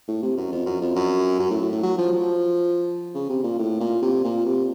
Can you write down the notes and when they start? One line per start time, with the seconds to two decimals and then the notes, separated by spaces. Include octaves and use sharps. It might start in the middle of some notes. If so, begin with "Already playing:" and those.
0.08 A2
0.22 C3
0.37 F#2
0.52 F2
0.66 F#2
0.81 F2
0.95 F#2
1.39 F#2
1.50 A2
1.61 A2
1.72 A2
1.83 F#3
1.98 F3
2.12 F3
3.14 C#3
3.29 C3
3.44 A#2
3.58 A2
3.80 A#2
4.02 C3
4.24 A#2
4.46 C3